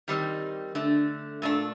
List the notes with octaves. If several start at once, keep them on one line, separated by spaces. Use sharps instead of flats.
D#3 G3 C4 D#4
D3 A3 D4
A#2 A3 D4